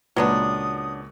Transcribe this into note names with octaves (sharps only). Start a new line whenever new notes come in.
C#2 A#2 F#3 B3 D4 D#6